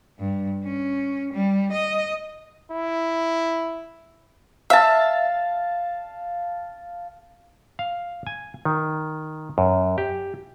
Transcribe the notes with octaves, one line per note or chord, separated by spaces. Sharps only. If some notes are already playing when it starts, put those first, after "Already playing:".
G2
C#4
G3
D#5
E4
E5 F5 A5
F5
G#5
D#3
F#2
G4